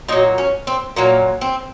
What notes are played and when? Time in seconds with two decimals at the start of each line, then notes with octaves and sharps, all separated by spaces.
0.08 A#2 F#3 D#4
0.38 C#4
0.67 C4
0.96 A#2 F#3 A#3
1.41 C4